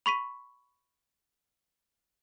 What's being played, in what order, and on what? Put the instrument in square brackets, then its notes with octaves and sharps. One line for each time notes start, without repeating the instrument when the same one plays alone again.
[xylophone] B5 C#6 B6 D#7